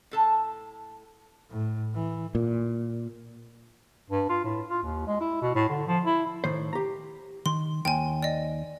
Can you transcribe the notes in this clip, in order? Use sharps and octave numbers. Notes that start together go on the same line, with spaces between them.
A2 A4 A5
A2
E3
A#2
G2
F4
A2
F4
D#2
G#3
E4
B2
A2
D3
F3
E4
A2 D#3 C5
G4 A#5
D#3 C6
D#2 G5 G#5
D5 D#5